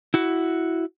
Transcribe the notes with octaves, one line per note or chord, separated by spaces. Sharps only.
E4 F#4